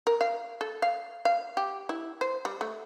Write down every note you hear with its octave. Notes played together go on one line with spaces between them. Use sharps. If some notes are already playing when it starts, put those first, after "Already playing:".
A#4
F5
A4
F5
F5
G4
E4
C5
G3
A3